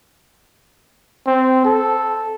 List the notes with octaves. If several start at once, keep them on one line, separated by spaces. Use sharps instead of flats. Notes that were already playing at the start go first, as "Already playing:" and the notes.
C4
A4